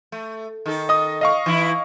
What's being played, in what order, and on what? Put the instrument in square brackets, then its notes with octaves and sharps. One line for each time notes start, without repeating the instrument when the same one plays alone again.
[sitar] A3
D#3 A4
[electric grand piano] D#5 D#6
D#5 F5 C#6
[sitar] E3 E4